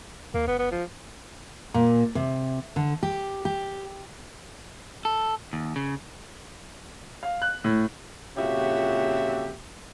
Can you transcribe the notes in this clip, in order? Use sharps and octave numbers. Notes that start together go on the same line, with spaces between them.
D#2 A#3
F#1 B3
B3
F3
A#2
C3
D3
G4
G4
A4
D#2
C#3
F5
F#6
A2
F2 A#2 C#3 F#4 G4 E5